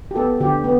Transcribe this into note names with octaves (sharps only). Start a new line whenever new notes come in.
G4
B3 A4
D3 G4
B3